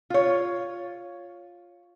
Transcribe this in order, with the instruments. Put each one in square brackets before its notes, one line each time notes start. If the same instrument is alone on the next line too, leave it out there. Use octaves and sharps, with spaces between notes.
[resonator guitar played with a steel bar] F4 C#5